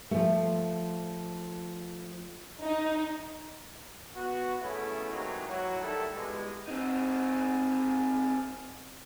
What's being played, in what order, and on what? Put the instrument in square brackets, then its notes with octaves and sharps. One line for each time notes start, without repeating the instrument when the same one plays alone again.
[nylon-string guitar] F3 A3
[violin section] D#4
[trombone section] B3 F#4
C#3 A3 B3 C#4 E4
C3 E3 F#3 G#3 A#3 D#4
F#3 E4 F#4
D#3 G3 A3 E4 A4
B2 E3 G3 G#3
[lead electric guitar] C4 D#4